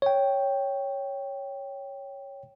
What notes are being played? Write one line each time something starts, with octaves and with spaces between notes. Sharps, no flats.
C#5 G5